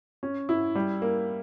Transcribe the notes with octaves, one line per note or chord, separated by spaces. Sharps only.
C#4
E4
G3
A#3